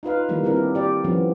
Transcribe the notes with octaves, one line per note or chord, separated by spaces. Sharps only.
D#4 F4 B4 F5
D#3 E3 G3 A#3
D3 G3 C4 D4 E4 A#4
G4
G4 D5
D3 E3 F3 G3 B3 C#4